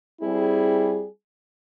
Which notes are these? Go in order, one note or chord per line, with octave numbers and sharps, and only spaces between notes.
G3 C4 E4 G#4